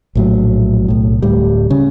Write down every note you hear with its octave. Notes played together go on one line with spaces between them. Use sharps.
A#1 A2 F#3
B1 A2
D1 A2 G3
C#3